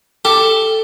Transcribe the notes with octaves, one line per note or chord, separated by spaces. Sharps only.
G4 A4